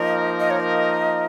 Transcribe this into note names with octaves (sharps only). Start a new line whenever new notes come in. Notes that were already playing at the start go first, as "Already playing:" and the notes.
Already playing: F3 A#3 D#4 A#4 D#5
D#5
C#5
D#5